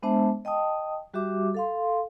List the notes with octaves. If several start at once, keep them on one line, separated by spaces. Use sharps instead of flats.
G#3 B3 D4 C5 E5 A5
D#5 G5 A5 D#6
G3 F#4 G4 E5 D6
A4 F5 C6